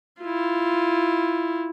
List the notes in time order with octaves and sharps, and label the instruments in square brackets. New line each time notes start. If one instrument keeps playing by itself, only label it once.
[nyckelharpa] E4 F4